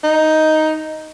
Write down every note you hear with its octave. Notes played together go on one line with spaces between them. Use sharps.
D#4